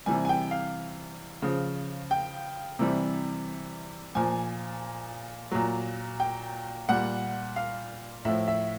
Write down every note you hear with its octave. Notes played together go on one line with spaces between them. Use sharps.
C3 E3 G3 G#5
G#5
G5
F5
C#3 F3
G5
C3 E3 G3
A#2 F3 G#5
A#2 F#3
G5
A#2 G3 F#5
F5
A2 F3 E5
E5